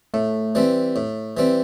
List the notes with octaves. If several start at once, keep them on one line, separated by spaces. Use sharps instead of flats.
A2 A3
E3 G3 C4
A2
E3 G3 C4